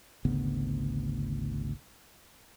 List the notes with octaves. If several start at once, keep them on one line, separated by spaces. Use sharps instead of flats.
G#1 D2 C#3 B3